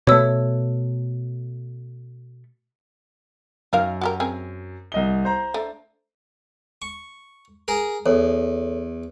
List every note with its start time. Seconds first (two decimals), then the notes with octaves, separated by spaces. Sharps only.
0.07 B2 A3 C#5 E6
3.73 F#2 D#4 A#4 F5
4.01 F#4 G4 A#4
4.20 C4 G#4 A#4
4.92 C2 D#5 G7
5.25 C5 A#5
5.54 A3 D4
6.82 C#6
7.68 G#4 A#4
8.06 E2 A4 C#5